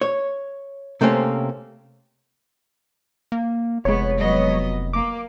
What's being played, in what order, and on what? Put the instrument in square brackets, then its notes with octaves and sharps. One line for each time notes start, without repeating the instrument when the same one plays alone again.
[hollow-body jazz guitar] C#5
C3 A3 A#3 C4 C#4
[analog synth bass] A#3
[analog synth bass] F1 [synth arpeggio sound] G#3 C#5 [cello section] B3
[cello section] F#3 B3 D#5
[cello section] A#3 [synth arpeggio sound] D6